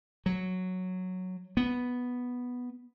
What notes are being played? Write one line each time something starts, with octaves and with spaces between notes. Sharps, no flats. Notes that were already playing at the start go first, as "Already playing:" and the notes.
F#3
B3